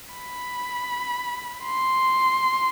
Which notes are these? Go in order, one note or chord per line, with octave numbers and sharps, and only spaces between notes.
B5
C6